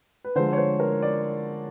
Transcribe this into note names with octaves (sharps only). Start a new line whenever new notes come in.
B4
D3 F3 G#3 C5
C#5
C5
A#4
D5